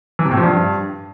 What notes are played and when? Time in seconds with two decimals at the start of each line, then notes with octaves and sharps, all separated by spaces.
0.19 E3
0.25 C3
0.31 A2
0.37 F3
0.43 G2